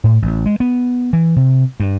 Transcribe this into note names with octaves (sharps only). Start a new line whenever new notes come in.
A2
A1
G#3
B3
E3
C3
G2